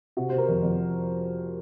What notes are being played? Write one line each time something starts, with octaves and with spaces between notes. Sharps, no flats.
C3 F#4
C5
C3
A#4
F2
F2